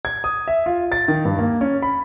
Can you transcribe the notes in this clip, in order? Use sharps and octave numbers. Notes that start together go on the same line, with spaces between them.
G#6
D#6
E5
F4
A6
D#3
G2
A#3
C#4
B5